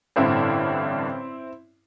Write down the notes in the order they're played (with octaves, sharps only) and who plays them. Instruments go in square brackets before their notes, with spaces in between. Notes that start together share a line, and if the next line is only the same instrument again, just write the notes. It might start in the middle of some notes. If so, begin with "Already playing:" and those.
[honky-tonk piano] A1 G2 D3 C4 E4